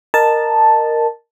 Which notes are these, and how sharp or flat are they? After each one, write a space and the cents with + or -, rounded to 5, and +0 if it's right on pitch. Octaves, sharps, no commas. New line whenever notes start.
A#4 -5 D#5 -25 A5 +0